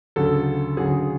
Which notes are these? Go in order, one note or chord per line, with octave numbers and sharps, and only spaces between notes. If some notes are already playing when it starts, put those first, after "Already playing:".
D2 C#3 F#3 A4
D2 C#3 F#3 G#4